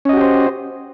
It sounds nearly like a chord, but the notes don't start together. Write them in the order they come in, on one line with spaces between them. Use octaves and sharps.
C#4 D#5 F#4 G4 C5